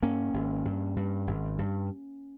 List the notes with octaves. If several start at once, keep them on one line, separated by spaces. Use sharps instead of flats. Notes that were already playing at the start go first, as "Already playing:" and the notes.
G2 A#3 C#4
G#1
G2
G2
G#1
G2